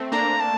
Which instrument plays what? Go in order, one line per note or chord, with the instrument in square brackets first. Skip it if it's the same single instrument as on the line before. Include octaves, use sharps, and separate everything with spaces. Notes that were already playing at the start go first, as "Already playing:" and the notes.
Already playing: [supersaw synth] A3 C4
[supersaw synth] A#3 D4 [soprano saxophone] A#5
[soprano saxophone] A5